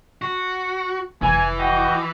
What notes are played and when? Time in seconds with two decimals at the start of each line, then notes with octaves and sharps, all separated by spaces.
0.22 F#4
1.22 F1 E3 G#5
1.59 F#4 D#5 G5